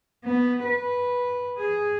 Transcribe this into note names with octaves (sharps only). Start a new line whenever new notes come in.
B3
B4
G#4